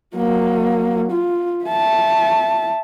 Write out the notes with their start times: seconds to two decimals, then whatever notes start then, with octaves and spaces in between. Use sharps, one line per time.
0.16 F#3 A#3
1.12 F4
1.65 E5 A5